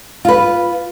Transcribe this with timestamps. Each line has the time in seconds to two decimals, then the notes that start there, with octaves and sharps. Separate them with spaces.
0.25 F4 B4